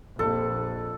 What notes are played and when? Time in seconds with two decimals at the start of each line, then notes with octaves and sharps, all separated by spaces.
0.19 A#1 F2 A4